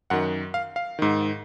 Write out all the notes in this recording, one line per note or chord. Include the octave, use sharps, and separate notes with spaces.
F#2 D#3 F#5
F5
F5
G#2 D#3